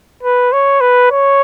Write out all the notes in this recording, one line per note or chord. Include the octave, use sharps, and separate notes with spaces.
B4
C#5
B4
C#5